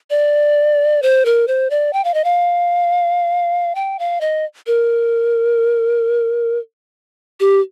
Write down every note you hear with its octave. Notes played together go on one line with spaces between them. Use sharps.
D5
C5
A#4
C5
D5
G5
F5
D#5
F5
G5
F5
D#5
A#4
G4